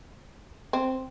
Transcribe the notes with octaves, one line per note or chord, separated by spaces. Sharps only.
C4